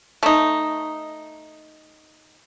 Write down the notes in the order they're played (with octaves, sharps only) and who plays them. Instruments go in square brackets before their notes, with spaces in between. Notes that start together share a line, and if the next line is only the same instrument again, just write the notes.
[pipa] A3 D#4